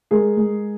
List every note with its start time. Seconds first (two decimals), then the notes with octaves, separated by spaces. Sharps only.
0.11 G#3 G#4 A#4
0.37 G#3